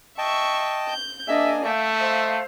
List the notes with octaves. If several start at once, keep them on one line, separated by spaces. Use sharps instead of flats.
D#5 E5 G5 A5 C#6
G6
A#3 D4 G#4 D#5 E5 G#5
A3 E5 F5 G5
C5 D#5 F5